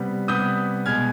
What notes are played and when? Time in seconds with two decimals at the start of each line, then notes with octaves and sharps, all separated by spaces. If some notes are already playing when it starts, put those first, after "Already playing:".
Already playing: C3 G3 B3
0.28 C3 G3 B3 D#6 G6
0.85 B2 G#3 B3 F6 G#6